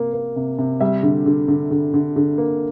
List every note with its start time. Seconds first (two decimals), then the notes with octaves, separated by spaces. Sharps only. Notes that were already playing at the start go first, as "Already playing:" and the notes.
Already playing: C3 A#3
0.13 A#3
0.36 C3
0.59 C3
0.80 G3 E5
1.03 D3
1.26 D3
1.48 D3
1.71 D3
1.94 D3
2.16 D3
2.38 A#3